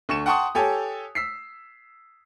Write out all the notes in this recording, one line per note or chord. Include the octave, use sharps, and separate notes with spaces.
D2 C#6 C#7 E7
F#5 G5 A5 C6 C#6 D#6
G4 A4 C#5 G#5
E6 B6 C7